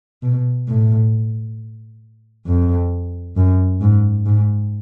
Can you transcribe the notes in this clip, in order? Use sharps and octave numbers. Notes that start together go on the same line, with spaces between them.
B2
A2
F2
F#2
G#2
G#2